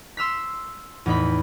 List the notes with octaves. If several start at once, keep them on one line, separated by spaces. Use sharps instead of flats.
C6 E6 F6 B6
E2 A2 D#4 B4 B5